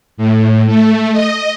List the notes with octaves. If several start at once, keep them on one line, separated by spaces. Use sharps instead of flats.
A2
A3
D#5